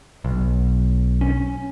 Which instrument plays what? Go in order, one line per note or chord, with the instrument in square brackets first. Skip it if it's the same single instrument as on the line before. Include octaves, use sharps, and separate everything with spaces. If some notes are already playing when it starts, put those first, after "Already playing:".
[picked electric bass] B1
C#4